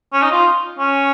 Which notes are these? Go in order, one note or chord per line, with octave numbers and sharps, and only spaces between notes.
C#4
D#4
F4
C#4